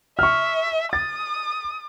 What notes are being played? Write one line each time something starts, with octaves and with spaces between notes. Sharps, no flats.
E5 C#6 F6
D#6 A6